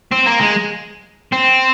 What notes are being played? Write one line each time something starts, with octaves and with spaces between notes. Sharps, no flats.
C4
A#3
G#3
C4